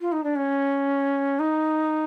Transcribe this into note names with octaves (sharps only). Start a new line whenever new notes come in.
F4
D#4
D4
C#4
D#4